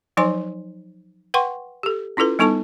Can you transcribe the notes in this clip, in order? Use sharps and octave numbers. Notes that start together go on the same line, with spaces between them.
F3 F#3 D#4 C5 G#5 C6
B4 F#5 G5 C6 C#6
G4 A4
C#4 E4 F4 A4 B4
G3 B3 D#4 A4 A5 C#6